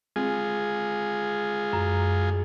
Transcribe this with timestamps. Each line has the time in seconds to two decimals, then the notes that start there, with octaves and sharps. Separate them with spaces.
0.16 G#3 C4 F4 G#4
1.73 F#2